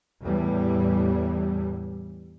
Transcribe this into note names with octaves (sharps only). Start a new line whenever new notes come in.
E2 A2 E3 G3